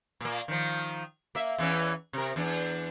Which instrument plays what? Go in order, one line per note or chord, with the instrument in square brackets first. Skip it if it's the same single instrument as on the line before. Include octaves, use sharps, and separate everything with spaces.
[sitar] A#2 A#3
D#3 F3
A#3 E5
E2 E3 C#4
C3 A#4
E2 D4